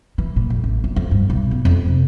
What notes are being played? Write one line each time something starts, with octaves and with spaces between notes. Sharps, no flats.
E3
A#2
F2
A1
F#1
F2
G2
B1
B3
F2
C3